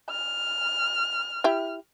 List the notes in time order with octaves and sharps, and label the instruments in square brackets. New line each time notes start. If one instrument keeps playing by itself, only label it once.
[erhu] F6
[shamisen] E4 G4 E5